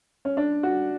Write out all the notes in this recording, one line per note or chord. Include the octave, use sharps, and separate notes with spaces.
C#4
D4
F#4